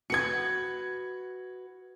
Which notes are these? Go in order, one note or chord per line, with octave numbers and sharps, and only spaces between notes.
F#4 B4 G#6 C#7